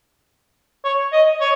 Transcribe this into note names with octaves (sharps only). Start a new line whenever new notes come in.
C#5
D#5
C#5